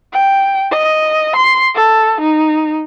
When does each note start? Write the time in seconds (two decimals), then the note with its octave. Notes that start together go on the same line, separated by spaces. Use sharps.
0.12 G5
0.71 D#5
1.36 C6
1.75 A4
2.21 D#4